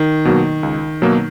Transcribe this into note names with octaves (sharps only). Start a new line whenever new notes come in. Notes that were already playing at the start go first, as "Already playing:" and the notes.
Already playing: D#3
B2 F#3 A#3
C#2
B2 F#3 A#3